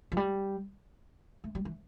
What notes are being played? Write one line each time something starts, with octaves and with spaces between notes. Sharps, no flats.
F3
G3
A3
G3
E3